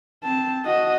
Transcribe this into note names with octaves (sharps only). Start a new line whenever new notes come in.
C4 A5
F#4 D#5